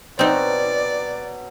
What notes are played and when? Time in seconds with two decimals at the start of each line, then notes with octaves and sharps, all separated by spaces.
0.19 B2 F#3 C4 D#4 D5